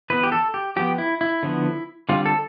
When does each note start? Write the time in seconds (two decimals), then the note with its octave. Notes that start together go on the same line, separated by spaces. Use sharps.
0.10 E3 B3 B4
0.23 G4
0.32 A4
0.54 G4
0.76 F3 B3 G4
0.98 E4
1.21 E4
1.43 D3 F3 B3
2.09 D3 G3 C4 F4
2.26 A4